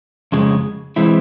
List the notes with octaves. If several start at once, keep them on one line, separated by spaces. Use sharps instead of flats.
F2 C#3 G#3
E3 G#3 C4 E4